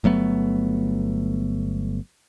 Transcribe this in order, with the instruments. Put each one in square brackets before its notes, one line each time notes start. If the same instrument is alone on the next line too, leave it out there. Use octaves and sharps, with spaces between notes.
[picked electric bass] G1 F#3 A3 B3